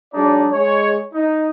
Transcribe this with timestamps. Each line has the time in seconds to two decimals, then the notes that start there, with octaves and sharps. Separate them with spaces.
0.13 F#3 G#3 D4 D#4 D5 A#5
0.52 G#3 C#5
1.14 D#4